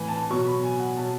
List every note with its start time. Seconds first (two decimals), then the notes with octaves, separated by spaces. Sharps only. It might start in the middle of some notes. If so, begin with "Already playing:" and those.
Already playing: A2 E3 G#5
0.09 A5
0.30 B2 F#3 C#6
0.47 B5
0.64 G#5
0.80 F#5
0.96 B2 F#3 A5